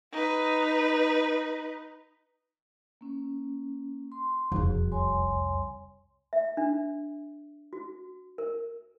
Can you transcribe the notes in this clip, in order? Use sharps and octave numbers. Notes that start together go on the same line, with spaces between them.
D#4 B4
A#3 C#4
C6
E1 C2 F2 F#4 G#4
C#5 G#5 C6
E5
D4
F#4
A#4